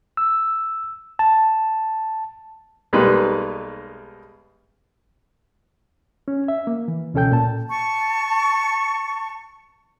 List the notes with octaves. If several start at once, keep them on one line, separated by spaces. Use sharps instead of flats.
E6
A5
B1 G3 G#3 A#3 D#4 B4
C#4
E5
A#3
E3
C#2 B2 C#4 A4 G5 G6
A#2 A5
A5 C#6